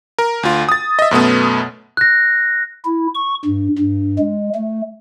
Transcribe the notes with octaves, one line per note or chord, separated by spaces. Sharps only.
A#4
D2 F4
D#6 A6
D#5 E5
F#2 B2 A3 B3
F#6 A#6
E4
C#6
G2
G2
G#3
A3